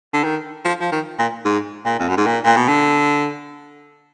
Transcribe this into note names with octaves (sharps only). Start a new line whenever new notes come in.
D3
D#3
F3
F3
D#3
A#2
G#2
A#2
F2
F#2
G#2
A#2
A#2
B2
D3